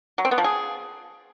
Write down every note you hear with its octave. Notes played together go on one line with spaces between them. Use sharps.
F#3
C4
B3
F3
G#4